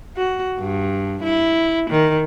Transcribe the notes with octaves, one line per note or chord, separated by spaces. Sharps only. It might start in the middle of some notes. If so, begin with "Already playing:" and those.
F#4
G2
E4
D#3